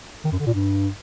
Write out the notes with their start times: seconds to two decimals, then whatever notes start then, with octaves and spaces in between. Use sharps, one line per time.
0.24 D#3
0.32 F#2
0.39 D3
0.46 A#2
0.54 G2